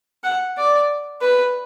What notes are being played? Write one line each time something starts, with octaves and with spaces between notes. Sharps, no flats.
F#5
D5
B4